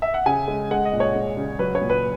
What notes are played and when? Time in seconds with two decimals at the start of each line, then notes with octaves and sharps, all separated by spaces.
0.02 E5
0.14 F#5
0.26 C#3 G#5
0.48 G#3
0.71 G#3 F#5
0.85 D#5
0.93 A#2
1.00 C#5
1.16 G#3
1.37 C#3
1.59 F#3 B4
1.75 C#5
1.81 A#2
1.90 B4